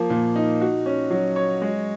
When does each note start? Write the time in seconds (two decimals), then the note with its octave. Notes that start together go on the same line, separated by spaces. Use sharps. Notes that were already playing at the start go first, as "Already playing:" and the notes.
Already playing: F3 A#3
0.10 A#2
0.36 D#4
0.61 F#4
0.86 C#4
1.11 F#3
1.36 C#5
1.62 G#3